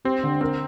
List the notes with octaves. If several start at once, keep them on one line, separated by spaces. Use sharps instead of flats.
C4 G4
D3
C4 A#4